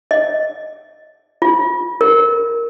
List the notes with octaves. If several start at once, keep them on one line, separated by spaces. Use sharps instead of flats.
D#5
F4
A#4